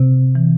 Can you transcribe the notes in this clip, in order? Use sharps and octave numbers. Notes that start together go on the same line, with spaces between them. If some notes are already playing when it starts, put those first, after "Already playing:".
Already playing: C3 C4
E3